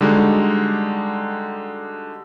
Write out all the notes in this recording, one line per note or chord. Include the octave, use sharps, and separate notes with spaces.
D3 G3 G#3 D#4 F#4